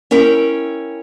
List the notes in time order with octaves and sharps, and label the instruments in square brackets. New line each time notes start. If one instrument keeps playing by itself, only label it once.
[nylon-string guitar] C#4 E4 A#4 G5